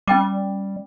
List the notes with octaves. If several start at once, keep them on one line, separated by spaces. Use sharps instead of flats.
G3 C#4 G5 D6